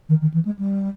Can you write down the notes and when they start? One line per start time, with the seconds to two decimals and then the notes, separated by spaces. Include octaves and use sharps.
0.09 D#3
0.21 D#3
0.33 E3
0.45 G#3
0.58 G3